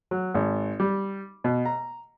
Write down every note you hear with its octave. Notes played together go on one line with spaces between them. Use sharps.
F#3
G#1
G3
B2
A#5